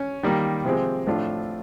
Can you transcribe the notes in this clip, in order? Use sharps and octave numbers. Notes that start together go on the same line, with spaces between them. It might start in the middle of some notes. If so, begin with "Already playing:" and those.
Already playing: C#4
D#3 G3 A#3
C3 F3 G#3 C4
A2 F3 A3 D4 F4